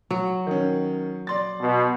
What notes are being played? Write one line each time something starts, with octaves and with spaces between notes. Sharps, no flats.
F#3
D#3 C#4
D5 C6 A6
B2